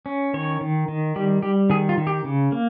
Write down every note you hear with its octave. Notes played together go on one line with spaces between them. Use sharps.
C#4
D#3 C#5
D#3
D#3
G3 G4
G3 G4
D#3 G#4
F4
D#3
G4
C#3
A#3